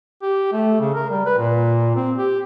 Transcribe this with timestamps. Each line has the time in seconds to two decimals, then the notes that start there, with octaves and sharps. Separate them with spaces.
0.23 G4
0.53 A3
0.80 C#3
0.95 A#4
1.10 G3
1.26 B4
1.38 A#2
1.96 C4
2.18 G4